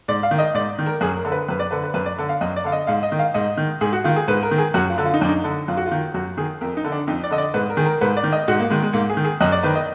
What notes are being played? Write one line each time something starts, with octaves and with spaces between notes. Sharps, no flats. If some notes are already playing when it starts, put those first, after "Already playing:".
G#2 D5
F5
D#3
D#5
G#2 D5
D#3
A#4
F#2 G#4
A#4
D3
B4
F#2 B4
D5
D3 B4
B4
F#2 B4
D5
D3
F5
F#2 D#5
D5
D3 F5
D#5
G#2 F5
D#5
D#3
F5
G#2 D#5
D#3
G#2 G#4
F#4
D#3 F4
G#4
G#2 B4
A#4
D#3
G#4
F#2 F#4
F4
D3
F4
D#4
F#2 D4
D#4
D3
F#2 F4
F#4
F4
D#3
F#2 F#4
D#3 G#4
F2 A#4
D#4
D3
D4
F2 D#4
D5
D3 D#5
D5
G#2 B4
A#4
D#3 G#4
A#4
G#2 B4
D5
D#3
D#5
G#2 F#4
A#3
D#3 G#3
G#3
G#2 A#3
G#4
D#3
G#4
F#2 D#5
D5
D#3 B4
D#5